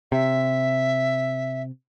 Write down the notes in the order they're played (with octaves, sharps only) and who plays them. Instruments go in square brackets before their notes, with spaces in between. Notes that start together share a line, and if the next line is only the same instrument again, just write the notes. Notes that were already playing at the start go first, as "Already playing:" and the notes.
[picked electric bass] C3 [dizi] E5